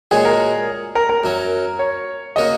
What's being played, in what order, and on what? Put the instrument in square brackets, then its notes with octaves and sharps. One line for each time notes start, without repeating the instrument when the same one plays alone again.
[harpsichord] A#2 G#3 F#4 C#5 [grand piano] G#4
[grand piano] A#4
A#4
A#4
[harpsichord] F#2 F#3 C#4
[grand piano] C#5
[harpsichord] C#3 A#3 F#4 A#4 [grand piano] D#5